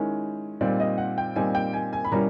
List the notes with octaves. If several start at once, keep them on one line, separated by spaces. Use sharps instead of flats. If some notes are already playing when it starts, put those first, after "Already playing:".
Already playing: D#3 G#3 C#4 E4
A#2 G3 C4 D#4 D5
D#5
F#5
G5
A#2 G3 C4 D#4 G#5
G5
G#5
G#5
B5
B2 G3 A#3 C#4 E4 A#5